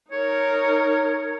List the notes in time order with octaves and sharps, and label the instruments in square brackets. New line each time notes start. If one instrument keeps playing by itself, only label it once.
[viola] D#4 A#4 [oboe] C#5